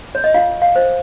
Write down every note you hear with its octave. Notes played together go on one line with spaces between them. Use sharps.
C#5
D#5
F4 F5
F5
C5